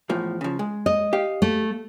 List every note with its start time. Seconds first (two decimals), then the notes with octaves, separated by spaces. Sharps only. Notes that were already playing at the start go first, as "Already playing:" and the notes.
0.09 E2 A2 F3
0.41 C#3 F3
0.59 G#3
0.86 D#5
1.13 G4 F5
1.42 A3